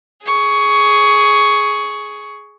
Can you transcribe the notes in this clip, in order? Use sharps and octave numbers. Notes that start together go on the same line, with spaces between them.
G#4 C#6